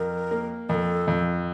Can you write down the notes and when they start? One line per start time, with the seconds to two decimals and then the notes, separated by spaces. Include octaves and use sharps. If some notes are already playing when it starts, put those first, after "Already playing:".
Already playing: F2 A#4
0.31 A#3
0.69 F2 A#4
0.74 A4
1.07 F2